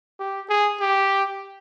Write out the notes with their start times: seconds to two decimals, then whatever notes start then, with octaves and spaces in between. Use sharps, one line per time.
0.20 G4
0.50 G#4
0.81 G4